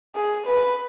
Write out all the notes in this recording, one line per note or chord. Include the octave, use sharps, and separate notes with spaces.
G#4
B4